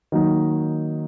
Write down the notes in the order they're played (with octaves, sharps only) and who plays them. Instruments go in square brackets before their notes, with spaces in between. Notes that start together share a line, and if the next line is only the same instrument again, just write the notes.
[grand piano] D#3 F#3 A#3 D#4